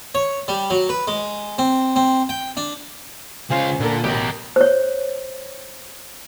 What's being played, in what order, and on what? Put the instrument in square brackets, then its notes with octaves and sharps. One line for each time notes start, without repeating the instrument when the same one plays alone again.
[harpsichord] C#5
G3
F#3
B4
G#3
C4
C4
G5
D4
[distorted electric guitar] C#2 F5 [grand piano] C#4 C5 G#5
[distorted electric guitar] A#2 [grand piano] D3 A4
[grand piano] A1 B2 [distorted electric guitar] G4 A#4
[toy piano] C5 C#5